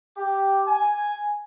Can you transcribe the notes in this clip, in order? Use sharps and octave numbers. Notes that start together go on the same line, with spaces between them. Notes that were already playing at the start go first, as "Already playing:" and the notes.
G4
G#5